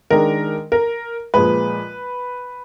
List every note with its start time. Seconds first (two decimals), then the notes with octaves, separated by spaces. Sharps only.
0.10 D#3 G#3 D4 A#4
0.72 A#4
1.34 A#2 F3 G#3 B4